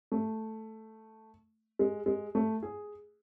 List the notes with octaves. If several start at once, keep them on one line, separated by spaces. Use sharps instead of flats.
A3
G#3
G#3
A3
G#4